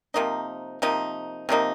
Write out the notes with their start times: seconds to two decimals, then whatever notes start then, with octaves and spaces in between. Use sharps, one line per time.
0.14 C3 F3 A#3 D#4
0.82 C3 F3 A#3 D#4
1.49 C3 F3 A#3 D#4